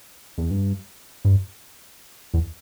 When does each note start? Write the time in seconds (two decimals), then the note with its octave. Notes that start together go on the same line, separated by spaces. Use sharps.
0.38 E2
0.51 G2
1.25 G2
2.34 E2